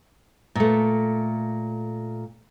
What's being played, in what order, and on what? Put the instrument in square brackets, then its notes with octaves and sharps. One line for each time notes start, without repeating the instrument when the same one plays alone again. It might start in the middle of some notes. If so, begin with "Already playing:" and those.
[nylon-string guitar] A#2 A3